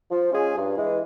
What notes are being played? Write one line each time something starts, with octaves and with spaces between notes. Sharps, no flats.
F3
G#3 C#4 F4 G#4
G2
E3 G#3